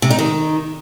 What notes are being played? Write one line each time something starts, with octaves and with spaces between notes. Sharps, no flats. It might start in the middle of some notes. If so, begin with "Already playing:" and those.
C3
D#4
D#3